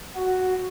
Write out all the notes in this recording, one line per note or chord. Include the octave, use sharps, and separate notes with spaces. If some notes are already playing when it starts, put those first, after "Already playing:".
F#4